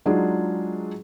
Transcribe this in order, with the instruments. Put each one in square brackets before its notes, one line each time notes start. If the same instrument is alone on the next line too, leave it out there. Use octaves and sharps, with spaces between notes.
[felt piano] F#3 G#3 D4 D#4 F4 G#4